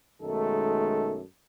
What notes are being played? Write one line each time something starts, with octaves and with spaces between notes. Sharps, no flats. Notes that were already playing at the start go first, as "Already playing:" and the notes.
B1 F#2 D#3 G#3 A3 A4